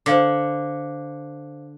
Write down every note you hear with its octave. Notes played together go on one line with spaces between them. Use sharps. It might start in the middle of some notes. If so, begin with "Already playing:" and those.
D3 C5 F5 D6